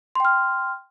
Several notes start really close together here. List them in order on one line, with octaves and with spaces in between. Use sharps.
C6 G5 F6